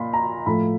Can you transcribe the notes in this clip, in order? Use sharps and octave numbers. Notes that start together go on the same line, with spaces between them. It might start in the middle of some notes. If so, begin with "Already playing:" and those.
Already playing: A#2 A#3 B5 C6
A#5
A2 F3 A3 B5